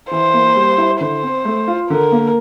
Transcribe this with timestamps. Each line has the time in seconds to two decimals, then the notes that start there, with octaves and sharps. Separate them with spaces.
0.11 E3 C5
0.34 A#3
0.56 G3
0.78 E4
1.00 D3 C5
1.23 C4
1.45 A3
1.67 F4
1.90 D3 A#4
2.12 A#3